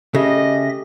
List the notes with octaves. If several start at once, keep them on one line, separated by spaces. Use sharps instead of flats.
C#3 G4 A4 D#5 E5 A#6